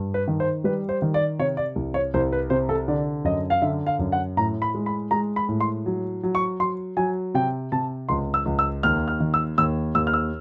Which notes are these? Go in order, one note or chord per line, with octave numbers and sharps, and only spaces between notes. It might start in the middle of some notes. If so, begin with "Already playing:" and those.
Already playing: G2
B4
D#3
C5
G3 B4
C5
D#3
D5
C3 C#5
D5
C2
C#5
C2 C5
B4
C3 C5
A4
D3 D5
F#2 D#5
F5
D3 E5
F5
F#2
F#5
A2 A#5
B5
G#3
B5
G#3 A#5
B5
A2
C6
F#3
F#3
C#6
F#3 C6
F#3 G#5
C3 G5
C3 A5
C#2 C6
E6
C#2
E6
D#2 F6
F6
D#3
E6
D#2 E6
D#2 E6
F6
E6